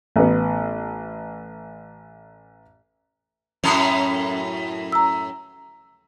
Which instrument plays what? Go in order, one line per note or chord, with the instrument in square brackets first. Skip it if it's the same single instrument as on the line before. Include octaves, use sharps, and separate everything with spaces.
[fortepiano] A1 B3
[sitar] F#2 A2 C#4
[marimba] A#5 E6